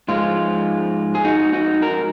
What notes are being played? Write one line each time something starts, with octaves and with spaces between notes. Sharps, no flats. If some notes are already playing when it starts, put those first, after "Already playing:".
G#2 F3 G#3 F4
G#4
D#4 F#4
D#4 F#4
F#4 A#4